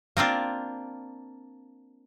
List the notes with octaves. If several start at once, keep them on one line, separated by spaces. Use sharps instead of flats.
A#3 C4 D4 F4